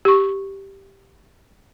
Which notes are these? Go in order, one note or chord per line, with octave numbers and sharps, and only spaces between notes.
G4 C#6